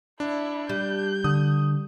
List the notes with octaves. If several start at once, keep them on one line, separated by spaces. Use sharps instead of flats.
D4 E4
G3 G6
D3 D#6